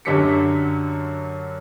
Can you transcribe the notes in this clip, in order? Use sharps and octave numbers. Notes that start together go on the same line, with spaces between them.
F#2 D3 F#3 G4 B6 C#7